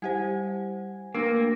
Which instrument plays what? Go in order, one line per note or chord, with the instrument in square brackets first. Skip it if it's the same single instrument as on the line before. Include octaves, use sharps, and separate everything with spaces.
[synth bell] G3 G4 C5 [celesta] F#5 G#5 G#6
[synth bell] A3 D4 A#4 [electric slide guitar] A#3 [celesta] E6 A#6